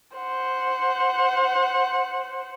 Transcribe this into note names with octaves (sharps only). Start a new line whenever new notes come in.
C5 F#5